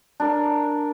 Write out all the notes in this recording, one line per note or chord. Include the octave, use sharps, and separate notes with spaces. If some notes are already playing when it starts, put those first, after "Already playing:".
D4 A#4